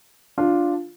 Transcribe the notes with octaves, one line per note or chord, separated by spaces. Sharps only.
D4 F4